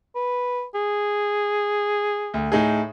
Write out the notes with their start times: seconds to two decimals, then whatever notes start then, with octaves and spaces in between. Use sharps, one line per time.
0.15 B4
0.75 G#4
2.34 D2
2.52 A2 D#4 G#4